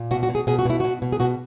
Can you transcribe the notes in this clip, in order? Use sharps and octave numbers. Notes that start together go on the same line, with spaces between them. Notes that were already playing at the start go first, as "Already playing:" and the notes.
Already playing: A#2
B2 F#4
F#4
B2
G#4
B2 G#4
F#4
B2 E4
B2 F#4
B2
G#4
B2 F#4